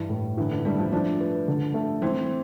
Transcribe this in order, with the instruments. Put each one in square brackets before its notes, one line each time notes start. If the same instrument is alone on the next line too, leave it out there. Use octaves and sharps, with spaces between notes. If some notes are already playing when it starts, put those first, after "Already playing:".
Already playing: [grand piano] G2 E3
A2
[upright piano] D3 [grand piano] E3
[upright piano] D3
[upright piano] G3 [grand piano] A3
[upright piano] F3
[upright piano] F3 [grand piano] D4
[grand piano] B4
D3
A3
[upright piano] E3 [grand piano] C4